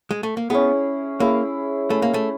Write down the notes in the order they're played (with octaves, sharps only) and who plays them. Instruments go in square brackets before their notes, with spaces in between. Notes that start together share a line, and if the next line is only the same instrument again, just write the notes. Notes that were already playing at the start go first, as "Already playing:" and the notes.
[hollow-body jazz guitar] G#3
A3
A#3
[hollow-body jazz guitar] B3 [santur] C#4 E4 G#4
[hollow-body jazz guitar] A#3 [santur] C#4 E4 G#4
[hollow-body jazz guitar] A3 [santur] C#4 E4 G#4
[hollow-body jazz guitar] A#3
A3